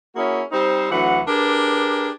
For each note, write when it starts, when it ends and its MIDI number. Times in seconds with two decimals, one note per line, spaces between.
0.16 0.42 58
0.16 0.42 61
0.16 0.42 64
0.16 0.42 66
0.16 0.42 68
0.52 0.88 55
0.52 0.88 60
0.52 0.88 63
0.52 0.88 72
0.91 1.20 38
0.91 1.20 52
0.91 1.20 54
0.91 1.20 78
1.27 2.09 62
1.27 2.09 67
1.27 2.09 68
1.27 2.09 70
1.27 2.09 71